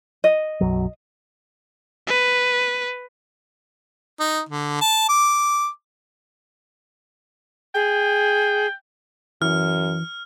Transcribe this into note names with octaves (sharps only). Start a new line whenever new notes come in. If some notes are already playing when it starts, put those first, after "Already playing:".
D#5
B1 F#2 F#3
B4
D#4
D3
A5
D6
G#4 G5
F#2 E3 F6